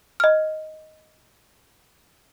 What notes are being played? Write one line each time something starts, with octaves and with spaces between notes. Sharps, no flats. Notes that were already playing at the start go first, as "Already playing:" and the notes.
D#5 F6